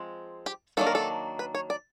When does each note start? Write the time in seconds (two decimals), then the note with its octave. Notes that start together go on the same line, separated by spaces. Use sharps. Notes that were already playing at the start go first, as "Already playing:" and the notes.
Already playing: F3 G#3 C4
0.46 G4
0.77 D#3 F#3 A#3 D4 A4
0.87 A#4
0.95 A4
1.39 B4
1.55 C#5
1.70 D5